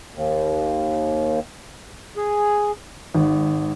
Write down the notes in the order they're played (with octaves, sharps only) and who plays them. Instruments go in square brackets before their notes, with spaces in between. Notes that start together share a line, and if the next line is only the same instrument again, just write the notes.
[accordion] D#2
G#4
[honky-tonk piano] G#1